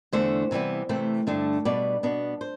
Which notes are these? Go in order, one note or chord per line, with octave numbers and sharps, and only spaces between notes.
E2 D3 A3 D4 C5
C3 E3 G3 B3
C3 E3 A3 C4
G2 D3 A3 D4
B2 G3 B3 D4 D5
B2 B3 D4
C5